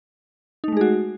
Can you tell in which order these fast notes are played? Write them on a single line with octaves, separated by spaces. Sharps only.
D#4 A3 G#3 G#4 F#4